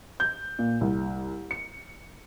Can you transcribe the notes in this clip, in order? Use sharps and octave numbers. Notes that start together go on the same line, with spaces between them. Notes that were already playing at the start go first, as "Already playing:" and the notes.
G6
A#2
C2
C#7